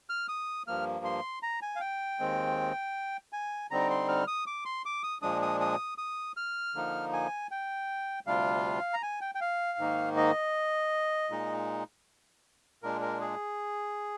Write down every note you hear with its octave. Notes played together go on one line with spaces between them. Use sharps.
F6
D#6
G2 F3 A#3 F6
C6
A#5
G#5
F5
G5
D#2 D#3 G#3 C4
G#5
D3 G3 C4 D#4 A#5
C6
F6
D#6
D6
C6
D6
D#6
A#2 F3 G#3 D4 D#6
D#6
D#6
D#6
F6
D3 F3 A#3 D#4
G#5
G5
D2 C3 G3 D4 F4 F5
A#5
G#5
G5
G5
F5
G#2 D#3 A#3 D#4
D#5
A#2 G#3 D#4
A#2 G#3 D4 A#4
A#4
G#4